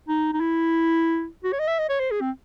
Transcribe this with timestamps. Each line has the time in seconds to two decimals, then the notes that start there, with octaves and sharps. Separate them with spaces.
0.08 D#4
0.33 D#4
0.40 E4
1.44 F#4
1.52 C#5
1.59 D#5
1.67 E5
1.79 D#5
1.89 C#5
2.00 C5
2.11 G#4
2.21 C4